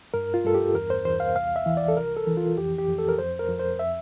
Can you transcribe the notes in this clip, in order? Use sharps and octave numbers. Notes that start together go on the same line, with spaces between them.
G2 A#4
F4
G2 A4
G4
E2 A#4
C5
E2 C5
F5
C2 F5
E5
E3
D5
A4
C2 A#4
A4
E3
F4
F2 G4
G4
F2
A4
A#4
F2 C5
A#4
F2
C5
E5